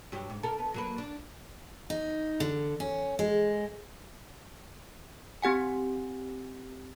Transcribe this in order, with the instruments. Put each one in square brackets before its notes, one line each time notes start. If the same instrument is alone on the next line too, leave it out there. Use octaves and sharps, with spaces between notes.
[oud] G2 F#3 G4
G#2
A4 A#4
B3
F#3 A#3 B4
D4
[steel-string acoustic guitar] D#4
D3
C#4
G#3
[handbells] C4 G4 F#5 G#5